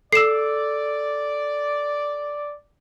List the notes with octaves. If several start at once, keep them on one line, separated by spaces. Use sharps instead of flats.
A4 D5 E6 C7 E7